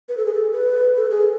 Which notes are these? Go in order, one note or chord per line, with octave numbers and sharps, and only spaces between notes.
B4
A4
G#4
A4
B4
A4
G#4